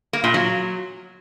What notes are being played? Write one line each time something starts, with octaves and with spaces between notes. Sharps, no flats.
A#3
A#2
F#3